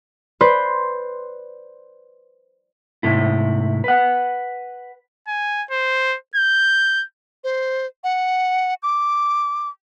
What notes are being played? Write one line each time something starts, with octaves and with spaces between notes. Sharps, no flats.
B4 C5 D5 C6
G#2 C3 A3 E4
B4 F#5
G#5
C5
G6
C5
F#5
D6